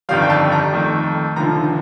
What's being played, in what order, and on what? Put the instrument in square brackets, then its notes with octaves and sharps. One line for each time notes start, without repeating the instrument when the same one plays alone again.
[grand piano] G1 F2 D#3 G3 F5
G5
A5
A#5
F2 D#3 A3
F1 D#2 D3 F3 A#5